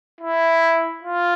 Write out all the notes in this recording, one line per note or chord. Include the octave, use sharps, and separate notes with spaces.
E4
F4